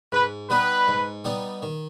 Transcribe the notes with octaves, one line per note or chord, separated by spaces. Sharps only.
G#2 B4
G3 B3 D#4 B4
G#2
G3 B3 D#4
D#3